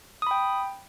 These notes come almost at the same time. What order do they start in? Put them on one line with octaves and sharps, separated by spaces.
D#6 B5 G5